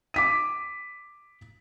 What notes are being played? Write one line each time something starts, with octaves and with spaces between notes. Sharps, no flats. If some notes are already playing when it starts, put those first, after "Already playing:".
D6 B6 D#7